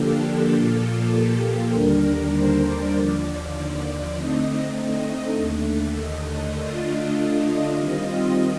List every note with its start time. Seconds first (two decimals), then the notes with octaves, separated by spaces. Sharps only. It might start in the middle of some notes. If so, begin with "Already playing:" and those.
Already playing: D3 F3 A#3 D4 G4 A4
0.23 G4
0.53 A#2 F3 A#3 F4 A4
1.14 G4
1.44 A4
1.74 D#2 D3 G3 D4 A#4
2.04 A#4
2.34 C5
2.65 D5
2.95 D#2 D3 F3
4.16 D3 A3 C4 D#4 D#5
5.37 D#2 D3 A3
5.97 D#5
6.58 D3 A3 D4 F4
7.18 D#5
7.79 D#3 G3 C4 F4